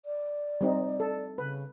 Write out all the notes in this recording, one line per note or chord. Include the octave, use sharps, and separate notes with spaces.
D5
G3 C4 D#4
A4
C#3 B4